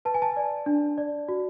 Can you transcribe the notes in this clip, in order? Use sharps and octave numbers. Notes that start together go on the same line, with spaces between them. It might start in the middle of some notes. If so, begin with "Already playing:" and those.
B4 A5
G#5
A5
D5
D4
D5
F#4